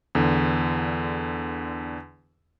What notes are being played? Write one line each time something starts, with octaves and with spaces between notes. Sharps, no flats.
E2 D3